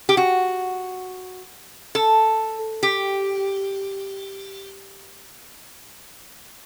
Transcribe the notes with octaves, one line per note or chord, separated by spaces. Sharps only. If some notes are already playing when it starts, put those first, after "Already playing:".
G4
F#4
A4
G4